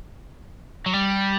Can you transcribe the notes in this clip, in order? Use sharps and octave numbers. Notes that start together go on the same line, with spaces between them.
F#3
G3